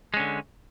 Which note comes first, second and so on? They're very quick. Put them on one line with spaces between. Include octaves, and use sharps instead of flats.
G#3 C#4 D3